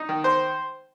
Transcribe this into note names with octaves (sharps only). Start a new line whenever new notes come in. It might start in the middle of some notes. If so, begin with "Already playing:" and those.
Already playing: D#4
D#3
C5